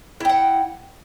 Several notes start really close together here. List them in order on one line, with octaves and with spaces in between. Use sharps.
E4 G5 F#5